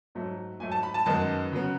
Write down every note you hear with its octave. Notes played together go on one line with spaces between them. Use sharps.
G#2 F#3 A3
G#2 F#3 A3 G#5
A5
B5
A5
F#2 D#3 G#3 B3 A5
C#3 F#3 B3